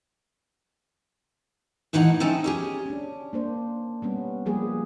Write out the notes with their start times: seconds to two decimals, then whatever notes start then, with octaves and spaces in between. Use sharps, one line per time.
1.93 D#2 A2 E3 D#4 F#5
2.20 F3 C#4 D#4 E4 A4 G5
2.44 C#4 G4 G#4
2.86 C#4 D4
3.33 A#3 D4 C5
4.02 G3 B3 C#4
4.46 F3 G3 A#3 G4 G#4 B4